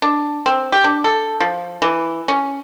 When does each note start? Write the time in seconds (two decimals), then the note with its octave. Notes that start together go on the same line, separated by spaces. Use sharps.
0.02 D4
0.46 C4
0.72 G4
0.84 D4
1.04 A4
1.40 F3
1.82 E3
2.28 C#4